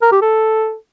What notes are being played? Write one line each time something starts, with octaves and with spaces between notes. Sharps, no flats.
A#4
G4
A4